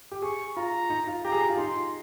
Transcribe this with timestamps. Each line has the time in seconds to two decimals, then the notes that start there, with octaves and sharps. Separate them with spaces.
0.11 G4
0.22 G#4 C#6
0.57 F4 A#5
0.90 D#4
1.07 F4
1.24 G4 A#5
1.32 G#4
1.41 G4
1.49 F4
1.57 D#4 C6